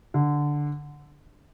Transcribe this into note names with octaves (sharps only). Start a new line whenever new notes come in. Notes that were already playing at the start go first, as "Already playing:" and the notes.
D3